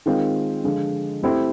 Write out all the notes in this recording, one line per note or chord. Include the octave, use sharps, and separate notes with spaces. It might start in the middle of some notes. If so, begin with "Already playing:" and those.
D#3 G#3 C4 F4
D3 F3 G#3
A3 C4 E4 G4 C5